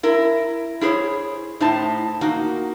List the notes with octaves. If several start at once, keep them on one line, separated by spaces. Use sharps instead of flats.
E4 A#4
E4 G#4 A#4 C5 C#5
A2 D#4 E4 C5 A5
A#3 D#4 F#4